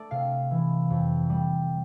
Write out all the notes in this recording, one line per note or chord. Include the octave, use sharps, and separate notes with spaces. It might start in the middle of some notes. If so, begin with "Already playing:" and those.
Already playing: A3 D5
C3 F5
E3
F2
G3